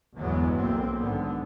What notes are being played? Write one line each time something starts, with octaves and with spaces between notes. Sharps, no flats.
G1 E2 E3 F#3 G#3 B3
B1 F#2 A#3 C4
G#1 D3 B3